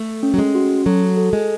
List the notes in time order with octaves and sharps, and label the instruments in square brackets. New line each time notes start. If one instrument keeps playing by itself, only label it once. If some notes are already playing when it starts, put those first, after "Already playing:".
Already playing: [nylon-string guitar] A3
[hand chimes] C#4
[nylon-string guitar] F#3
G#3
[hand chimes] F#4
[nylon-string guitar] F#3 [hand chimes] A4
[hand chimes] A4
[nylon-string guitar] G#3